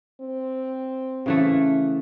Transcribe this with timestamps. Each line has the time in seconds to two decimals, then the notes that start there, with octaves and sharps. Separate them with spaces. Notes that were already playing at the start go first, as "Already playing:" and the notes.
0.21 C4
1.26 C#3 E3 A3